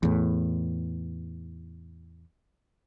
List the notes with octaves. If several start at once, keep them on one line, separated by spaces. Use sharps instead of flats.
E2 A2